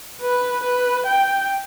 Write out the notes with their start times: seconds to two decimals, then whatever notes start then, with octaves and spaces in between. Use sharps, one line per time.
0.22 B4
0.64 B4
1.06 G5